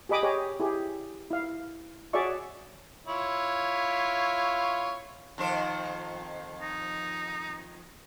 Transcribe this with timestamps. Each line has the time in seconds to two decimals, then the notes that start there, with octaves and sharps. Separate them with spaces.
0.09 G4 G#4 D#5 B5 D6 D#6
0.23 G4 G#4 C#5 D#5
0.60 E4 G4 G#4
1.31 E4 F5
2.13 F#4 G#4 C#5 D5 E5 C#6
3.06 E4 F4 C#5
5.38 F2 D#3 C5
6.62 D#4